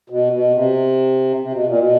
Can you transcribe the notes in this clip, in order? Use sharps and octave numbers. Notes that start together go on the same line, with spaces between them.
B2
B2
C3
C3
B2
A#2
B2